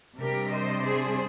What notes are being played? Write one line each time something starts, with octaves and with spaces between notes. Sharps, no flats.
C3 G3 D4 G4 A#4
C5 D#5
G#4 C5